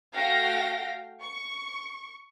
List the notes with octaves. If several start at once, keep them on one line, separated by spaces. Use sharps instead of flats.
A3 F#4 F5 G5 A#6
C#6